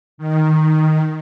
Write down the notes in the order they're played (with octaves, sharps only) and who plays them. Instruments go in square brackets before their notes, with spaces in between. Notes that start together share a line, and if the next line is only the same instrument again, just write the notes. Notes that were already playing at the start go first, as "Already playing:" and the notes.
[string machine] D#3